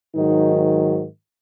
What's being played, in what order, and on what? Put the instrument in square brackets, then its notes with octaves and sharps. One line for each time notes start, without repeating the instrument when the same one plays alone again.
[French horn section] G#2 D#3 F#3 D#4